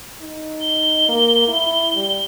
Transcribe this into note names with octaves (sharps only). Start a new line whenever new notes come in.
D#4
G7
A#3
E4
G3